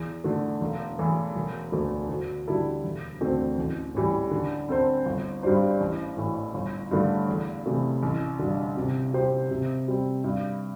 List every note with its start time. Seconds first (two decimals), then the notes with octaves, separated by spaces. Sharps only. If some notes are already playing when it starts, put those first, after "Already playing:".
Already playing: E2
0.24 D3 A3
0.61 E1
0.99 E2 E3 A3
1.36 E1
1.72 D2 D3 A3
2.09 D2
2.47 D3 G3 E4 A4
2.84 E1
3.21 D2 D3 A3 C4
3.58 A1
3.95 A2 E3 G3
4.31 D3
4.69 C4 A4 C5
5.06 G1
5.43 G2 G3 D4 C5
5.81 A1
6.17 A2 E3
6.54 G1
6.91 G2 D3 A3
7.28 E2
7.66 C3 E3 A3
8.03 A1
8.39 G2 D3
8.77 C3
9.13 G3 C4 G4 C5
9.51 C3
9.88 G3 C4
10.24 G2